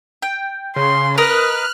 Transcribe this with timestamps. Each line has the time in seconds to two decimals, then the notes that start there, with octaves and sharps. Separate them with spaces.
0.22 G5
0.76 C#3 C6
1.18 A#4 B4 D#5 F6 F#6